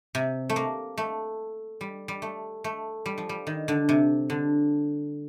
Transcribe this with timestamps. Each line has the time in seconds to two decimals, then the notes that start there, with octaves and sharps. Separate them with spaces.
0.15 C3
0.49 A3
0.56 A#3
0.97 A3
1.81 G3
2.08 G3
2.22 A3
2.64 A3
3.06 G3
3.18 F3
3.29 G3
3.47 D#3
3.68 D3
3.89 C3
4.30 D3